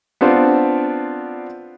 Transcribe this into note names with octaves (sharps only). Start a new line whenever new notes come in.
B3 C4 D4 F4 C5